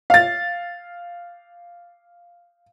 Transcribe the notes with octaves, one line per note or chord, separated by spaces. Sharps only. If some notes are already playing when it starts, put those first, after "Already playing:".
F5 A6